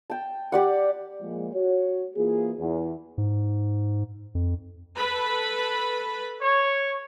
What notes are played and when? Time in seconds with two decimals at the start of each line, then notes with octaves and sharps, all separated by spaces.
0.10 G5 A5
0.52 G4 D5 F#5
1.22 A#2 F3 G#3
1.54 F#4 C#5
2.16 E3 A#3 F4 G#4
2.59 E2
3.18 G#2
4.35 F2
4.97 A4 B4 B5
6.41 C#5